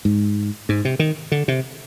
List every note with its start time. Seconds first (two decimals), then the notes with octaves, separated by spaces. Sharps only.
0.05 G#2
0.69 G#2
0.85 C3
0.99 D#3
1.32 D3
1.48 C3